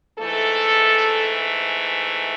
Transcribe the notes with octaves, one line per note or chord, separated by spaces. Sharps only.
G#2 E3 A3 A4